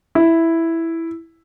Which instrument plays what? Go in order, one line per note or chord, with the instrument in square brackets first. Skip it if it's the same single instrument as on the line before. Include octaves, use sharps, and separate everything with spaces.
[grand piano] E4